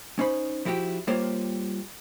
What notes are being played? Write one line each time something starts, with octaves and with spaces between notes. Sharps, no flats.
C#4 D#4 C5 B5
F3 E4 F#4 G4 G5
G3 A#3 F4 G4 C5 C#5